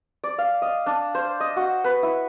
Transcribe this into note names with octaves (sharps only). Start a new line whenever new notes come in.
D5
F5
D#5
D4
C5
D#5
F#4
B4
E4